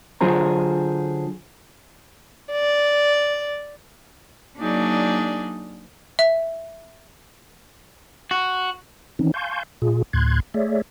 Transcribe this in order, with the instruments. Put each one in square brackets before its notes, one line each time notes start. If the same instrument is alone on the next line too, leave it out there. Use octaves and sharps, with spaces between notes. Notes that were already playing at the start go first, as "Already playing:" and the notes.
[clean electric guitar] D3 F#3 F4 G#4 C5 A#5
[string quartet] D5
F#3 A#3 D4 D#4 G#4 D5
[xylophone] E5
[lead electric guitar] F#4
[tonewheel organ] D#3 E3 C4 C#4 D#4
F5 G#5 A5 C6 C#6 G6
A#2 F4 G#4
D2 A2 C6 F#6 G#6
A3 G#4 C#5 D5 E5